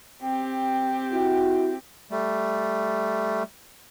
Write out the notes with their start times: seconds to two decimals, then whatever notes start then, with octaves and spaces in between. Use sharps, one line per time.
0.22 C4 G4
1.12 E4 F#4
2.11 G3 A3